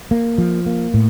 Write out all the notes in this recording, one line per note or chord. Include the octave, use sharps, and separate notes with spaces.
A#3
F3
A#3
A2